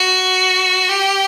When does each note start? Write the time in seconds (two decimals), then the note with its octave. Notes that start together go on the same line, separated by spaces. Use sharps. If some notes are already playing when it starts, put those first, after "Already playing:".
Already playing: F#4
0.89 G4